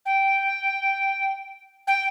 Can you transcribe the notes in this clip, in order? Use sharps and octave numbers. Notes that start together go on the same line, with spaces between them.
G5
G5